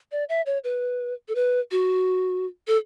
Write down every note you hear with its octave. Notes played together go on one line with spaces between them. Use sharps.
D5
E5
C#5
B4
A4
B4
F#4
A4